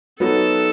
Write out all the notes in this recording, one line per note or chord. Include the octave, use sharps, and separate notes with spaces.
F#3 B3 D#4 F#4 A4